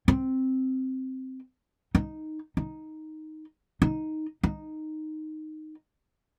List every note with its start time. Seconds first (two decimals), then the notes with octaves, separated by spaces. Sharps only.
0.08 C4
1.95 D#4
2.57 D#4
3.82 D#4
4.43 D#4